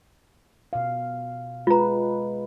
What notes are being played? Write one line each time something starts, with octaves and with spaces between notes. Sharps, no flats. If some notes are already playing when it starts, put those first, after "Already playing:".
B2 F5
G#3 F4 B4 A#5